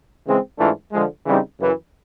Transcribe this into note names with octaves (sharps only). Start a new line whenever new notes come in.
C#3 E3 G#3 C4
G#2 E3 A3 D4 F4
D3 F3 G#3
C#3 E3 G3 C4 D#4
F#2 C#3 E3